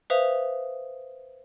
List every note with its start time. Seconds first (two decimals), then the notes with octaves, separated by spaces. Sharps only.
0.10 B4 C5 E5 F5 D#6 F7